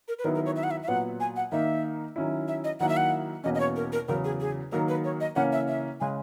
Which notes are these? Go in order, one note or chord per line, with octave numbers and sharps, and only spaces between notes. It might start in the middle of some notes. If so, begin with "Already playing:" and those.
A#4
B4
D#3 F#3 B3 E4 A#4
A#4
C#5
E5
F#5
E5
E5
A#2 F#3 B3 F#5
G#5
F#5
D#3 A#3 D#4 E5
D#3 F#3 C#4 E4
E5
D#5
D#3 F#3 A#3 E4 F#5
E5
F#5
E2 B2 A#3 C#4 D#5
D#5
C#5
A#4
A#4
E2 C#3 F#3 A#4
G#4
G#4
D#3 F#3 A#3 A#4
B4
C#5
D#5
C#3 E3 A#3 C#4 F#5
E5
E5
C#3 G#3 G#5